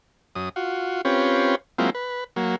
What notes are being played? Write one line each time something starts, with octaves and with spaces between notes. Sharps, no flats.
F#2 D#6
F4 F#4
C4 C#4 F4 G4 B4 C#5
F#3 G#3 A#3 C4 E4 F4
B4
F#3 A#3